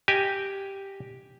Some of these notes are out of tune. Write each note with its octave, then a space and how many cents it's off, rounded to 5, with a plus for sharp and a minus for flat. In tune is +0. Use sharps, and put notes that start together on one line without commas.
G4 +0 D#5 -5 G#5 +0